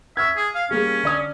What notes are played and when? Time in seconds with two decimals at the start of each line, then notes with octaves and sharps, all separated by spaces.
0.17 E5 C#6 F6 G#6
0.37 G#4
0.55 F5
0.71 G3 A#3 C#4 G#4
1.03 D3 D5 D#6